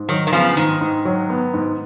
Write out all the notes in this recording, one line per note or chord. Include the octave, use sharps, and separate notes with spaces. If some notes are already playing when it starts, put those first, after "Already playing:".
Already playing: G#2
D#3 F#3
D#3
C#3 F3 B3
G#2 D#3
G#2
F#3
B3
G#2